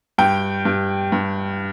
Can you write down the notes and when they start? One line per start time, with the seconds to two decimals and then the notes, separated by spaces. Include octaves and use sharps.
0.18 G2 G5
0.65 G2
1.12 G2